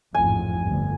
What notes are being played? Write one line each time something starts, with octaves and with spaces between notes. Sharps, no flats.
A1 F2 G#2 G#5
G1 D2